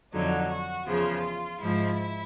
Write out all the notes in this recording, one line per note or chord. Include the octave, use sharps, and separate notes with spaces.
F2 D3 F#3 D#4
F#4
E2 C#3 F3 F4
G#2 F3 E4